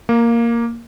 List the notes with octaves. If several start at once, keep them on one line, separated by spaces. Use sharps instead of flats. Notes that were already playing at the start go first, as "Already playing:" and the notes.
A#3